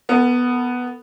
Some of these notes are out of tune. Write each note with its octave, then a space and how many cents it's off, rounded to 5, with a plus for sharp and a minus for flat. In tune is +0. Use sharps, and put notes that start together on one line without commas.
B3 +0 A#4 -45